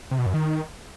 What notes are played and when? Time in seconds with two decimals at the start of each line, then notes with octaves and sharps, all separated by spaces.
0.11 C3
0.19 B2
0.26 F#2
0.34 D#3